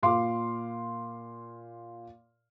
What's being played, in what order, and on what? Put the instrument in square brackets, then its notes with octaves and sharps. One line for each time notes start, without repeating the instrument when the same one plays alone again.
[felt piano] A#2 F5 C6 D6